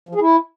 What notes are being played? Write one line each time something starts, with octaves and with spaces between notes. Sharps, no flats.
F3
G#4
E4